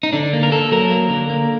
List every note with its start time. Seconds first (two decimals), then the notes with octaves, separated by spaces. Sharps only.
0.03 D#4
0.13 D3 D4
0.33 A#3
0.43 A#4
0.51 A#3 A4
0.71 F#3 A#4
0.91 A#3
1.10 D3
1.30 A#3